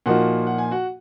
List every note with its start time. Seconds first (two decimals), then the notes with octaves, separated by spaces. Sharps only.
0.06 A#2 F3 A#3 D#4 F#4 F#5
0.47 F#5
0.58 G#5
0.71 F#4 F#5